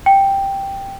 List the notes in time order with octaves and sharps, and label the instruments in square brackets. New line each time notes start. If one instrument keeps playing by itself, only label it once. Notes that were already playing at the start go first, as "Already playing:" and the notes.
[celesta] G5